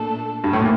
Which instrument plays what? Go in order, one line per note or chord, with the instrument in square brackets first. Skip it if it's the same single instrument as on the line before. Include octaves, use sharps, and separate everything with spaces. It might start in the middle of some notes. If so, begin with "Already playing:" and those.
Already playing: [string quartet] A#2 A3 D4 A4
[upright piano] G2
A2
A#2